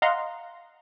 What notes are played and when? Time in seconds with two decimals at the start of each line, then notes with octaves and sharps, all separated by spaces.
0.02 D#5 F5 F#5 A#5 C6